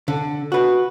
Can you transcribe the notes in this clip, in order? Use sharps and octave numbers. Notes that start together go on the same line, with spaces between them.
D3
F#4 B4